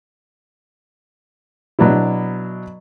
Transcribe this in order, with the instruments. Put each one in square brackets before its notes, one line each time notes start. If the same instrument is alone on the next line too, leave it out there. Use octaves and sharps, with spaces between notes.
[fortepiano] B2 F#3 B3 D4 E4